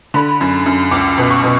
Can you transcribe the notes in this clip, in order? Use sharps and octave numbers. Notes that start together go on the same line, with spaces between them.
D3 B5
F#2
F#2
C#2 D6
B2
C#6
B2